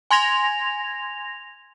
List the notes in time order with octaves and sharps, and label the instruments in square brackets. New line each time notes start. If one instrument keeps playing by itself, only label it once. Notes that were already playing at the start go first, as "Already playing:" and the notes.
[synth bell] G#5 C6 G#6 A#6 F7